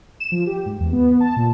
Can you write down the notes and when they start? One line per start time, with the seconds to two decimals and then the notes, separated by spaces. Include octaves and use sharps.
0.20 E7
0.32 F3
0.47 G4
0.66 G#2
0.80 E2
0.93 B3
1.20 A5
1.36 A#2